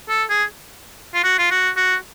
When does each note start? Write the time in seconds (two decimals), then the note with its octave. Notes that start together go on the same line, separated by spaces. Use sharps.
0.09 A4
0.30 G#4
1.15 F4
1.24 F#4
1.39 F4
1.51 F#4
1.77 F#4